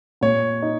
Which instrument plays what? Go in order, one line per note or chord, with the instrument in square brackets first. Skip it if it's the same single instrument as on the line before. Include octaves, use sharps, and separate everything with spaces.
[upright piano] A#2 [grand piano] C#5
[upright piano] D#4